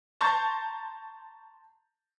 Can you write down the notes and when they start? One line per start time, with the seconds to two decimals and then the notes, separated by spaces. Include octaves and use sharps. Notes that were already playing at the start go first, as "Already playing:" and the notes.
0.21 A5 A#5 C6 C#6 G6 A6